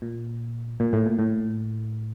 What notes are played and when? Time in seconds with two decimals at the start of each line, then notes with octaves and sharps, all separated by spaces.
0.02 A#2
0.80 A#2
0.93 A2
1.06 A#2
1.19 A2